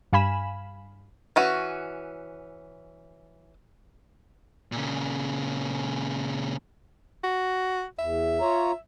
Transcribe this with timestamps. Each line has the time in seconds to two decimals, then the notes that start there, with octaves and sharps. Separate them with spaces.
0.13 G2 F5 G#5 B5 E7
1.36 E3 C#4 F#4
4.72 A#2 C#3
7.24 F#4
7.99 E2 E5
8.41 F4 C#5 A#5